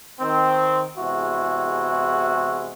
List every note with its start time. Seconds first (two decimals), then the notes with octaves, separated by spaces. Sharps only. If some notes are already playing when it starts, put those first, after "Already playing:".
0.20 D#3 C4
0.97 E2 C3 G#3 E4 F#4